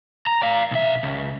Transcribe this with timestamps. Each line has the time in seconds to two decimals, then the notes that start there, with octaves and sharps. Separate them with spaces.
0.27 A#5
0.42 D5 F5
0.71 B1 E5
1.03 C#2